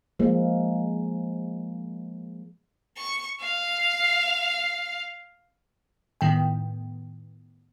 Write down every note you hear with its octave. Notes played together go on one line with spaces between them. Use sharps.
F3 G#3 A#3
C#6
F5
A2 D#3 B3 G5